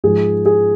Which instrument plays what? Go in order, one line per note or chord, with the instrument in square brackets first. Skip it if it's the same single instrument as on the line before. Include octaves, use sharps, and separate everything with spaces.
[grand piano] G#2 F3 G#4
G#4